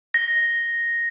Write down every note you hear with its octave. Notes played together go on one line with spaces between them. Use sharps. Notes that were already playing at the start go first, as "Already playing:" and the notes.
A#6